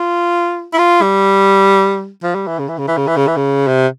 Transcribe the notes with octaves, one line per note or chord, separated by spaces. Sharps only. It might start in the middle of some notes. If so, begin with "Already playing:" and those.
Already playing: F4
E4
F4
G3
F3
G3
E3
C#3
E3
C#3
E3
C#3
E3
C#3
E3
C#3
C3